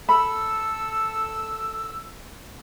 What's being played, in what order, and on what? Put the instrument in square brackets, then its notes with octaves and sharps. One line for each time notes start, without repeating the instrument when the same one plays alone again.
[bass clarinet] A4 [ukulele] B5 [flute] E6